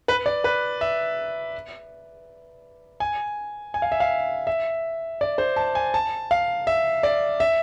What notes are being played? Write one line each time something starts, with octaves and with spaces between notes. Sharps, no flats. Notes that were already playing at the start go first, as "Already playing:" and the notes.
B4
D5
B4
E5
G#5
G#5
F5
E5
F5
E5
D5
C5
A5
G#5
A5
F5
E5
D5
E5